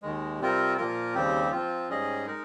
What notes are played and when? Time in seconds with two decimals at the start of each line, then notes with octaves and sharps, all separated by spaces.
0.02 D#2 D#3 G#3
0.40 C3 G3 C4 F4 A#4
0.77 A#2 F3 A#3 F4 A#4
1.14 D#2 C#3 G3 C4 G4
1.51 F3 C4 F4
1.89 G#2 G3 C#4 G#4 D#5
2.26 G#3 D#4 A#4